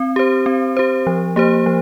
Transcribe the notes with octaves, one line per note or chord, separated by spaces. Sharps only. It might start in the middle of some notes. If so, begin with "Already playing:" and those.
Already playing: C4
G4 C5
C4
G4 C5
F3
A#3 G4 C5
F3